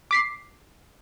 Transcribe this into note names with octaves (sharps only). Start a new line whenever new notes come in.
D6 B6 C7